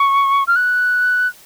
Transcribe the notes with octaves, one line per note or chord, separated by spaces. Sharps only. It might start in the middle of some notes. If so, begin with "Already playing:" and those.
Already playing: C#6
F6
F#6